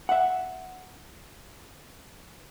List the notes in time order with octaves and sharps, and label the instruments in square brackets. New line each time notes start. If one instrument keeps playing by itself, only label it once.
[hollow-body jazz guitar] E5 F#5